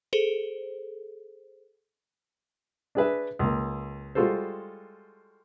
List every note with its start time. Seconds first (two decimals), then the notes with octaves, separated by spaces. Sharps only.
0.13 G#4 A4 C5
2.95 D4 G#4 B4 E5
3.39 C#2 A#3
4.15 G3 G#3 F4 F#4 A4 C5